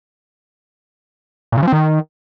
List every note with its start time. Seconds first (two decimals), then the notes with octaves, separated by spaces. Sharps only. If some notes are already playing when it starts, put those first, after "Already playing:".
1.52 A#2
1.57 C#3
1.62 F3
1.68 C4
1.73 D#3